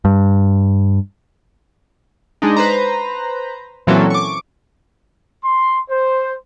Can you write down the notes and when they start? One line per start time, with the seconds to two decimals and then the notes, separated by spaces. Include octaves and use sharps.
0.05 G2
2.42 G#3 D4 D#4
2.57 B4 C5 A#5
3.87 A#2 E3 F#3 C4 C#4 A4
4.10 C#6 D6
5.43 C6
5.90 C5